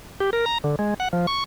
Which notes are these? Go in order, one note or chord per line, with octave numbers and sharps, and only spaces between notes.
G4
A#4
A#5
D3
G#3
F#5
F3
C#6